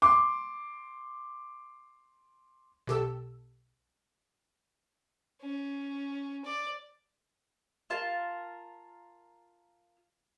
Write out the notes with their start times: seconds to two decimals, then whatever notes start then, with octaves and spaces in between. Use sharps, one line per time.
0.02 C6 D6
2.87 B1 G4 A4 E6
5.42 C#4
6.45 D5
7.90 F4 A#4 A5